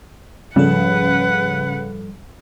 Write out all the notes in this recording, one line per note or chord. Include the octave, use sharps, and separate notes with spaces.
G#2 C#3 F3 G3 A4 B4 F#5